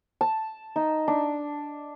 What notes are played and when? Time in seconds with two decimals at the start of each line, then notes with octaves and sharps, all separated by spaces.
0.21 A5
0.76 D#4
1.08 D4